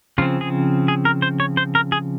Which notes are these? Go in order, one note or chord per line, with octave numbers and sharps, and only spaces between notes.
C#3 F3 C4 F4
G#4
G#4
A#4
C5
C#5
C5
A#4
G#4